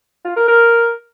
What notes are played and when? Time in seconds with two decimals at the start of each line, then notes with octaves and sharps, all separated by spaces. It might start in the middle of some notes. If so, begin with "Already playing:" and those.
0.25 F4
0.36 A#4
0.48 A#4